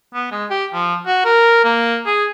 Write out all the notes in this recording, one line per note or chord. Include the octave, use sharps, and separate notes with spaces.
B3
G#3
G4
F3
F#4
A#4
A#3
G#4